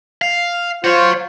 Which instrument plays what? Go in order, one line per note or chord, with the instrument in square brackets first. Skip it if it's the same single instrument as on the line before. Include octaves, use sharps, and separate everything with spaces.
[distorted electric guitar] F5
[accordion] F4 C5 [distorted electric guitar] F#4 C#5